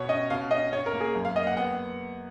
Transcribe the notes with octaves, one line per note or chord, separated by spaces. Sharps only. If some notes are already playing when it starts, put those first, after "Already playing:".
Already playing: B2 C#5
C#4 D#5
B2 F5
C#4 D#5
C#4 C#5
A#4
A#3
G#4
F#2
F5
A#3 D#5
F#5
B3 F#5